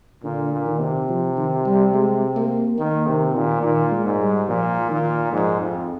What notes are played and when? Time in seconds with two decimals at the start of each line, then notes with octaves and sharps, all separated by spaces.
0.23 A#2 D3
0.52 A#2
0.66 D#3
0.81 C3
1.09 F3
1.37 D#3
1.66 G3
1.94 G#3
2.36 A#3
2.78 D#3 A#3
3.06 C3 D#3
3.35 A#2 D#3
3.63 A#2 D#3
3.91 G#3
4.05 G#2
4.20 G3
4.49 A#2 F3
4.90 A#2 D#3
5.32 G#2 F3
5.61 F2